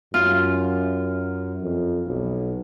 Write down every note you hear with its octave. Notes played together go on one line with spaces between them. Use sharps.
F#2 F4
F2
B1